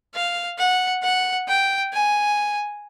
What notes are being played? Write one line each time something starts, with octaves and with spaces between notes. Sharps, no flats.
F5
F#5
F#5
G5
G#5